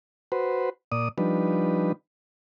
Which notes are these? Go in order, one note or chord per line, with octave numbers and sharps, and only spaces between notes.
F#4 B4 C5
A#2 D5 D#6
F3 G3 D4 D#4 B4